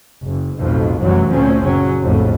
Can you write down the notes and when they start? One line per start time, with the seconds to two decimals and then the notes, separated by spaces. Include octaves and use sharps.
0.23 F#1
0.59 B1 F2 A2 F3
1.00 F1 C2 F#2 E3 F#3
1.30 D2 A#2 F3 C4 C#4
1.65 F#1 A#2 F#3 C#4
2.02 A#1 F2 A2